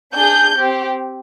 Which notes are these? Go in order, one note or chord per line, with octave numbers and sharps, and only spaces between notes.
D4 G#4 G6
C4 G4